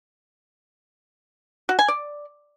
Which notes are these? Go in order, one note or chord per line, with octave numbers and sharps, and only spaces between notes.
F#4
G#5
D5